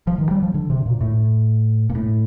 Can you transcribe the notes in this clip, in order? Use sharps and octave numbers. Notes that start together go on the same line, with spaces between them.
F3
D#3
G3
F3
D3
C3
A#2
A2
A#2
A2